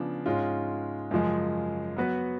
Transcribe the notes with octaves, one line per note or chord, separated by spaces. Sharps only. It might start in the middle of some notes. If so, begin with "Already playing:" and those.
Already playing: C#3 F3 B3 D4
G#2 G#3 C#4 F4
F#2 C#3 F3 G#3
F#3 B3 F#4 B4